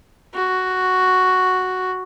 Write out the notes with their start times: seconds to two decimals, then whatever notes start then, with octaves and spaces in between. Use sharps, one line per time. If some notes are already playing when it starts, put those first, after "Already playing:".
0.34 F#4